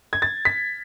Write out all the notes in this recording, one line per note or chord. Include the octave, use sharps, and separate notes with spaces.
G#6
A6
B6